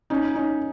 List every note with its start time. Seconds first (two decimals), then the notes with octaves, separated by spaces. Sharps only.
0.10 C#4 D#4
0.35 C#4 D#4